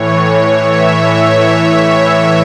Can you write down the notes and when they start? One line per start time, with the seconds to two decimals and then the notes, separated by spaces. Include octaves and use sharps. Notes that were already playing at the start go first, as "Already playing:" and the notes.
Already playing: A2 E3 C#5
0.68 E5